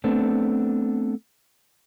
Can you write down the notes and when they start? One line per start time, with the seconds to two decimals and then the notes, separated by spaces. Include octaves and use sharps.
0.04 A3 B3 C4 D4